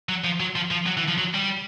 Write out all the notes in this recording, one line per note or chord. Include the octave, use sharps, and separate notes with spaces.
F#3
F3
F#3
F3
F3
F#3
E3
F3
F#3
G3